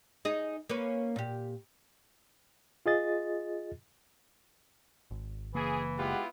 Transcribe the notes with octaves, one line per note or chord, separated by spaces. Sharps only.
D#4 G#4 D#5
A#3 C#4 B4
A#2 G4
F4 G#4 D#5 A6
G#1
F#1 C#3 E3 A#3 G#4
G#3 B3 E4 F4 G4 F#5